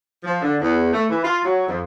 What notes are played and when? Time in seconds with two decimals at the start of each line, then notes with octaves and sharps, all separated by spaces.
0.23 F3
0.41 D3
0.60 E2
0.92 A3
1.10 E3
1.23 F4
1.43 F#3
1.67 F2